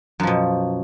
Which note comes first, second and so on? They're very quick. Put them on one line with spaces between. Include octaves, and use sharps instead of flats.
F#2 F3 B2